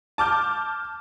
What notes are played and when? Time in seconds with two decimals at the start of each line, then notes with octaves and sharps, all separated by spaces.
0.18 A5 D6 F6 G6